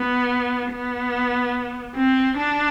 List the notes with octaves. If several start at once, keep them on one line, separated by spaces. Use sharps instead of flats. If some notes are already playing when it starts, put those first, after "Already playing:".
Already playing: B3
B3
C4
D4